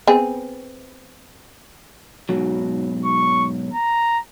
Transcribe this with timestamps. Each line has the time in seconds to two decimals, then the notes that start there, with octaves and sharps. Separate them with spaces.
0.07 B3 C4 G#4
2.29 G#2 B2 F#3
3.05 C#6
3.74 A#5